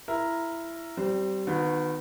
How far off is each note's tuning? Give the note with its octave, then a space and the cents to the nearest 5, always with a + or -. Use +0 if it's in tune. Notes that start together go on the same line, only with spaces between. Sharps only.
E4 +15 A#4 +0
G3 -25 C4 -5
D#3 -20 B3 +10 F#4 -40